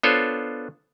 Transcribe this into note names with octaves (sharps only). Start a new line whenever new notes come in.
B3 D4 F4 A4 C5 C#5